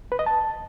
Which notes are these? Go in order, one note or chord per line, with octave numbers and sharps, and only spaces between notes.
B4
D#5
A5